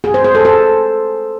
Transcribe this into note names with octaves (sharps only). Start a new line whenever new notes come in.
G#4
C5
C5
A4
A4